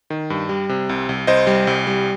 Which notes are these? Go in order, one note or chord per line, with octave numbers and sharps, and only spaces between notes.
D#3
G2
G3
C3
C2
C2
C2 C5 D#5
G3
C2
G3